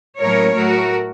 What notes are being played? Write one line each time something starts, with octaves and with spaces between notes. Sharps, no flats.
A2 F#3 A#3 C#4 A#4 C#5
A2 F#3 A3 F#4 A#4